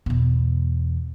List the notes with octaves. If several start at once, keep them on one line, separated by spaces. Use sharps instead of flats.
E2 B2